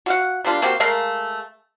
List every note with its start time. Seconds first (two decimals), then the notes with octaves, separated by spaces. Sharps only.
0.06 F#4 F5 F#5
0.45 G3 A#3 D4 F4
0.62 A#3 C4 F#4 G4
0.80 G#3 A3 A#4 F5